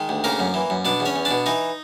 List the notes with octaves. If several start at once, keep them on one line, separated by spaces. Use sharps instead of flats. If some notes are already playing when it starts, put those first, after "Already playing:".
Already playing: D#3 G#3 G#4
D2
C#3 A#3 A#4
F#2
E3
F#2
B2 D4 D5
E2
C#4 C#5
E2
D4 D5
B2
E3 D#4 D#5